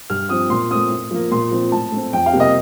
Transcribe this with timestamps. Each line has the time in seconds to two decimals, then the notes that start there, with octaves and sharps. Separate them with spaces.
0.10 G2 F6
0.29 F3 C4 D#6
0.50 A#2 C6
0.71 A3 C4 D#6
0.91 A2
1.11 F3 A#3
1.31 A#2 C6
1.51 F3 C4
1.72 A2 A5
1.92 A3 C4
2.13 F2 G5
2.26 F5
2.33 C3 G3 A#3
2.40 D#5